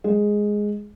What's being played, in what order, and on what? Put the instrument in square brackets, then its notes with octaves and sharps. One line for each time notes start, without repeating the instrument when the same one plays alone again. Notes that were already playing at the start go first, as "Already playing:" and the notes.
[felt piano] G#3